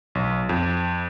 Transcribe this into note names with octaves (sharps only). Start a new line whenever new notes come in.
B1
F2